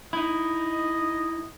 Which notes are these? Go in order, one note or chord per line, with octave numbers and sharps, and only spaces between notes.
D#4 E4 D#5